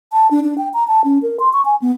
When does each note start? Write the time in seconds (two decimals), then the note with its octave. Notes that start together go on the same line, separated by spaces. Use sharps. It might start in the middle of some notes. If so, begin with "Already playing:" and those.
0.12 A5
0.31 D4
0.43 D4
0.58 G5
0.74 A#5
0.88 A5
1.04 C#4
1.22 A#4
1.40 C6
1.53 C#6
1.65 G#5
1.82 B3